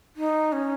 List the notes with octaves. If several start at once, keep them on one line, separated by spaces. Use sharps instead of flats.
D#4
C#4